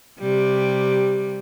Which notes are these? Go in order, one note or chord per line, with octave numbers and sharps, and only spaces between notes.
C3 G3